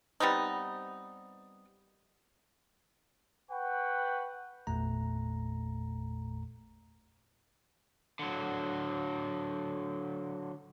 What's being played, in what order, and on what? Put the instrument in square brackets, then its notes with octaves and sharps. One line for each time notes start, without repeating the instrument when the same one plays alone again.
[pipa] G3 B3 C4 D#4
[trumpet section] B4 F#5 G5 C#6
[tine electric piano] G#1 E2 A#2 A3 A#5
[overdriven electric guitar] D3 F#3